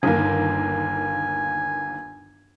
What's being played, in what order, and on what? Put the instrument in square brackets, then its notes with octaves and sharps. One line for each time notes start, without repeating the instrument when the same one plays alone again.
[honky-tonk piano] G1 D#2 A#3 [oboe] G#5